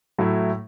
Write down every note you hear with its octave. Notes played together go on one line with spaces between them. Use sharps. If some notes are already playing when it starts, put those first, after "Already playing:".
A2 F#3 A3 E4